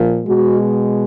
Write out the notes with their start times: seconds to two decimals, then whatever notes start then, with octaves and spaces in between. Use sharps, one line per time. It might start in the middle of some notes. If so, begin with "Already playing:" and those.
Already playing: A#2 F3
0.25 B2 G#3 F#4